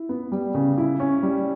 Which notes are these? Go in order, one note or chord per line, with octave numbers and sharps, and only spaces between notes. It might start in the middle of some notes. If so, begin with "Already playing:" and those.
Already playing: E4
B3
G3
C#3
E4
C#4
G3